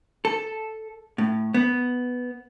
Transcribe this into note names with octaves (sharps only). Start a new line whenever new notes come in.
A4
A2
B3